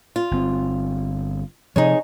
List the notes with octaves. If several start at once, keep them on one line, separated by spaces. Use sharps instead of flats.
F4
G1 C4
C3 F3 D#4 G#4 C#5